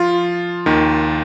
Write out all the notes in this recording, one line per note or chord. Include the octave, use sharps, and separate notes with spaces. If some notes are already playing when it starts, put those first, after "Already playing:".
Already playing: F3 F4
D#2 D#3